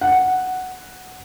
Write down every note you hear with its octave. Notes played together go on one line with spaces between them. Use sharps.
F#5